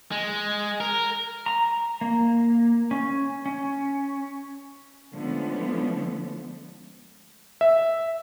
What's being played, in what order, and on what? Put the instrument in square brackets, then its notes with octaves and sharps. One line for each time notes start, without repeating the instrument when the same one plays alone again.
[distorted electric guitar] G#3
A#4
[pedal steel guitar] A#5
A#3
C#4
C#4
[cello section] D3 F3 G#3 A3 B3 C#4
[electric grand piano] E5